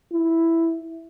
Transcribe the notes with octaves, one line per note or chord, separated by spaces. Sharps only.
E4